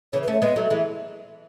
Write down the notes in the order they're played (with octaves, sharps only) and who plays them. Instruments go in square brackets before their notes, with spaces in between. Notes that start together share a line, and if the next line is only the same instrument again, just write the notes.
[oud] C#3 E3 [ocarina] C#5
[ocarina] B4
[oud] A3 C#4 [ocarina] C#5
[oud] G#3 B3 [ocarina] D#5
[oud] F#3 A3
E3 G#3